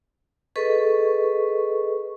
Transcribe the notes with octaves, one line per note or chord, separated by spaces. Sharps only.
G#4 A4 B4 D#5 C#6